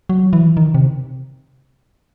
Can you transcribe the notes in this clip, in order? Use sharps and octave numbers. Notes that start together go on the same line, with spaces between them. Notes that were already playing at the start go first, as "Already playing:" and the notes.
F#3
E3
D#3
C3